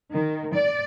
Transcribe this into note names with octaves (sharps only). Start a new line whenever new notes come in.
D#3
D5